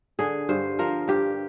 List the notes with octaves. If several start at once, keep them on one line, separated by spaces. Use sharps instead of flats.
D3 G#4
G2 C5
F3 A#4
G2 G4